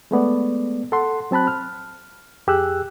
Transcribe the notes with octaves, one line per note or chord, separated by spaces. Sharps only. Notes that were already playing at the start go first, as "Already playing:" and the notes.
G#3 A3 B3 D5
A4 F#5 C6
F#3 C4 A5 B5 F#6
F6
F2 G4 G#4 E6 F#6